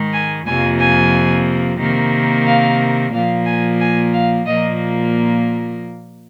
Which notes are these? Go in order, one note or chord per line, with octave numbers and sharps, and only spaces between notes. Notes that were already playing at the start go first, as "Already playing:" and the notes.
Already playing: G#2 D#3 G#3
G#5
F2 C3 F3 A#3 G#5
G#5
C3 D#3 A#3
F5
A#2 F3 A#3 F5
G#5
G#5
F5
A#2 F3 A#3 D#5